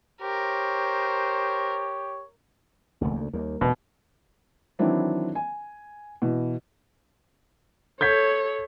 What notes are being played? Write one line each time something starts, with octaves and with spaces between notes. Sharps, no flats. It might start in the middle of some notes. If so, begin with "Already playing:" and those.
G4 A#4 C5 C#5
E1 D2 C#3 A3 A#3
D2
D#2 G3 A#3 A#4
E1 B2
D#3 E3 F#3 C4 D4 E4
G#5
B2 E3
A4 C#5 G6 G#6 B6